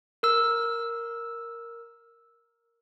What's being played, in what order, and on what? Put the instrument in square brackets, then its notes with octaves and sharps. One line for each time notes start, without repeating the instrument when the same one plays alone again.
[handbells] A#4 E6